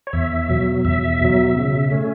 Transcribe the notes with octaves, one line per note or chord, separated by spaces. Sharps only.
C#5
E2 E5
B2 F#3
E2 E5
B2 F#3
C#3
A3 C#4